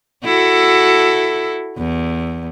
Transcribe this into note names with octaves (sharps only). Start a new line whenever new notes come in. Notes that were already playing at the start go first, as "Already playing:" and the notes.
E4 F#4 A4
E2